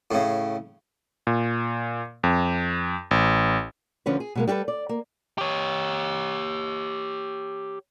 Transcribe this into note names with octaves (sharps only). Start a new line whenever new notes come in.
A2 C#3
A#2
F2
A1
D2 D3 F3 C#4 F4 B4
G#4
B2 G#3 A#3
G3 F#4 G4 A4 B4
D5
A#3
G4 C#5